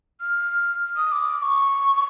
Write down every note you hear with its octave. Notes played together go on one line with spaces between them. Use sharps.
F6
D#6
D6
C#6